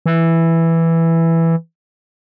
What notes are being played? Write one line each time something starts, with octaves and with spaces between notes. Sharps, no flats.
E3